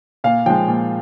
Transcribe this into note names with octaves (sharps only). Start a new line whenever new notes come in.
A#2 F5
F3 G#3 G5
A#2